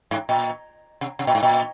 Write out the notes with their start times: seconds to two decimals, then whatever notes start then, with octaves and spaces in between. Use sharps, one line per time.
0.11 G#2
0.29 A#2
1.01 C3
1.19 C3
1.27 A#2
1.35 G#2
1.43 A#2